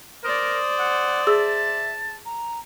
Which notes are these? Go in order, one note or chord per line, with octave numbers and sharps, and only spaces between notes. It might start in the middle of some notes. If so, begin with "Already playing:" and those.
A#4 C5 D5 D#6
F#5
G#4 E5 A5 E6
A#5